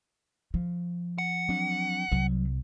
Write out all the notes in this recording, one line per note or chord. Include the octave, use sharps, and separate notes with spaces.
F3
F#5
F#3 C4 D4
C2 F#3